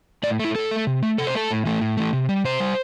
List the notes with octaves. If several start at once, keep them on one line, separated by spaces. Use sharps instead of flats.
A2 D5
A3
E4
A2 A4
A3
C3
A3
C3 A4
C5
A3 A4
A2
E3 A3
A2
E3 A3
C3
G3
C3 C5
G3